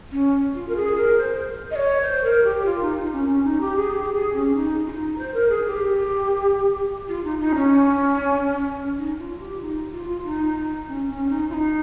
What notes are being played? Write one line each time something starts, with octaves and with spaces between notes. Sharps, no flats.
C#4
F4
A#4
G#4
A#4
C5
D#5
C#5
C5
A#4
G4
F4
D#4
D#4
C#4
C#4
D#4
G4
G#4
G4
G#4
C#4
D#4
F4
D#4
C5
A#4
G#4
G4
F4
D#4
D#4
C#4
D#4
F4
G4
D#4
F4
F4
D#4
C#4
C#4
D#4
F4
D#4